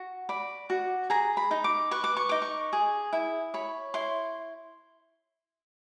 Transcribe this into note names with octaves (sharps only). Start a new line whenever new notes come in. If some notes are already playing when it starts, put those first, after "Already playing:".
Already playing: F#4
D5 B5
F#4
G#4 A#5
B5
D#4
D6
B4 C#6
D6
C#6
D#4 D6
C#6
G#4
E4
C#5 B5
E4 C6